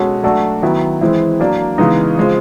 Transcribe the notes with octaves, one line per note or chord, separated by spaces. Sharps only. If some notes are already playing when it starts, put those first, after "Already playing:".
Already playing: B2 G#3 C#4 F#4 A4
F#3 A3 D4 F#4 A4
D#3 F#3 B3 E4
E3 G#3 C4 E4
F#3 A#3 D4
C#3 E3 G#3 B3 D#4
C#3 F3 G#3 C4